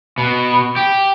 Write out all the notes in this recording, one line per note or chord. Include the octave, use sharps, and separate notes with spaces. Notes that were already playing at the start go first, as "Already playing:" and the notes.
B2
G4